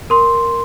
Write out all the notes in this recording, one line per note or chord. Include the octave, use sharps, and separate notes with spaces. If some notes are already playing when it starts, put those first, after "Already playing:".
A#4 C6